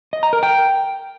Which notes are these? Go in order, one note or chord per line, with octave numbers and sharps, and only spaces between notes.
D#5
A#5
A#4
G5